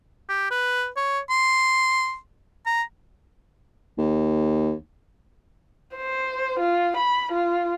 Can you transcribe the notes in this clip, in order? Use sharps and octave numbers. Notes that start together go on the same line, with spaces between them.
G4
B4
C#5
C6
A#5
D#2
C5
F4
B5
F4